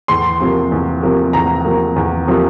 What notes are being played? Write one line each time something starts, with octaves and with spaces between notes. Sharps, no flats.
E2 C6
C3 F3 A#3
E2
C3 F3 A#3
E2 A#5
C3 F3 A#3
E2
C3 F3 A#3